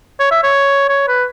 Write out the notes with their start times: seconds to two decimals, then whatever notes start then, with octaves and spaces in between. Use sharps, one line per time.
0.20 C#5
0.31 E5
0.43 C#5
0.89 C#5
1.08 B4